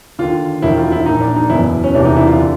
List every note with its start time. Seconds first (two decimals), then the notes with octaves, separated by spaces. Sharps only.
0.19 D#2 D3 F4
0.62 E1 D#2 D#3 E4
0.77 F4
0.92 E4
1.06 A#1 A#2 D#4
1.21 D4
1.36 D#4
1.50 F#1 E2 B2 E4
1.84 C#4
1.94 E1 E2 C3 E3 D4
2.05 D#4
2.16 E4
2.27 F4
2.38 D3